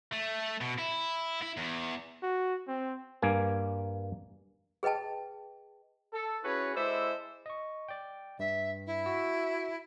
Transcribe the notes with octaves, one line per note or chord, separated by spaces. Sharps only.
A3
B2
E4
E4
E2
F#4
C4
G2 A#3 G#5
G#4 B4 D#5 G5 A5
A4
C#4 E4 F#4 G#4 B4 C#5
G#3 E4 A4 C5 D5 E5
D#5 C#6
D5 G5
G2 E5
E4
F#4 E6